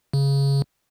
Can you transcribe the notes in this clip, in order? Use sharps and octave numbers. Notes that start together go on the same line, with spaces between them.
C#3